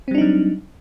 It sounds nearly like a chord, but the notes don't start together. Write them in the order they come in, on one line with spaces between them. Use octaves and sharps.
C4 G3 D4 D#4 F#3